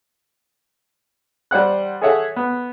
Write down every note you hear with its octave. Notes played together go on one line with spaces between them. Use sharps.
G3 C5 F#5 F#6
G#4 A4 C#5 E5 F#5 G#5
B3